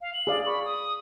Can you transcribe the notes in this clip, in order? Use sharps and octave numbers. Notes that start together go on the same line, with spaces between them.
F5
F#7
G#4 D5 F5
B5 C#6
D#6